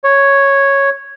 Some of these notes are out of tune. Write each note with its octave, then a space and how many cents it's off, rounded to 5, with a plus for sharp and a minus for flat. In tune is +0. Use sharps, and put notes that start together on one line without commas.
C#5 -5